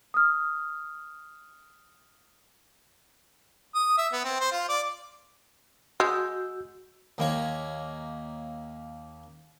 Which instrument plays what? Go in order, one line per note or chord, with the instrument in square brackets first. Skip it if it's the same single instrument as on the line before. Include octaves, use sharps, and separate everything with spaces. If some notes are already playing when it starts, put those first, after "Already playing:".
[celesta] D#6 F6
[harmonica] D#6
E5
B3
C4
C5
F4
D5
[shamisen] G#3 [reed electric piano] F#4 E6 G6
[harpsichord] D#2 A#3 C#5